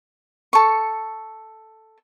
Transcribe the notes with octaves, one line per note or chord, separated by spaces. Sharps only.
A4 C#6